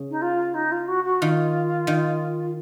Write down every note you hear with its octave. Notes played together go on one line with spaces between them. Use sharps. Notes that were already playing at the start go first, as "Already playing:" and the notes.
Already playing: C#3
D#4
F4
D#4
F4
F#4
F#4
D#3 F4
D#3